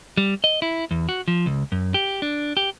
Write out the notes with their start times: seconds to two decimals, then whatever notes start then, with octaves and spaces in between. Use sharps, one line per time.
0.17 G3
0.44 D#5
0.62 E4
0.91 E2
1.09 F#4
1.28 F3
1.46 C#2
1.72 F#2
1.94 G4
2.22 D4
2.57 G4